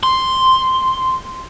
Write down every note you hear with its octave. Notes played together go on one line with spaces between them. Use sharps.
C6